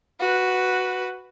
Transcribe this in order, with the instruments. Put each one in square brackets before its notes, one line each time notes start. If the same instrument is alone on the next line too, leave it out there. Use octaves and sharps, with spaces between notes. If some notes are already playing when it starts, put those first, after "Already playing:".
[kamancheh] F#4 B4